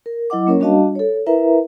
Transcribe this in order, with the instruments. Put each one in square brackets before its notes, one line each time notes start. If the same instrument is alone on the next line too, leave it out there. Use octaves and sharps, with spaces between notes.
[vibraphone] A#4
F#3 E4 D#5 F#5 D6
A#3 C#4 A#4 C#5
G3 D4 F#4 D#5 F5 A5
A4 C#5
E4 A#4 B4 E5 A#5